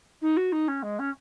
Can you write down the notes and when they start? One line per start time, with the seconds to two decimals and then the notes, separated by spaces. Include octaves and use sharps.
0.21 D#4
0.37 F#4
0.52 D#4
0.68 C#4
0.83 G#3
0.99 C#4